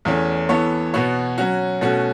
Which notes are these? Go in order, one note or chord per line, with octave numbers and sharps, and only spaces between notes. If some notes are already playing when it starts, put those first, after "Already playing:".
E2 E3 A3 C#4
E3 B3 A4 C#5
B2 B3 F#4 C#5
F#3 C#4 F#4
B2 A3 C#4 F#4